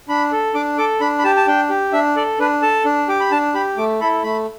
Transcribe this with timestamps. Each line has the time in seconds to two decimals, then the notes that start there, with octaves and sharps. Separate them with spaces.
0.08 D4 B5
0.32 A4
0.54 D4 D6
0.78 A4 D6
1.01 D4 B5
1.19 B5
1.24 G4 A5
1.37 A5
1.47 D4 G5
1.69 G4
1.93 D4 E5
2.16 A4 D5
2.39 D4 B4
2.62 A4 A5
2.85 D4
3.08 G4 D6
3.20 B5
3.31 D4 A5
3.54 G4 B5
3.77 A3 D6
4.00 E4 A4 B5
4.23 A3 B5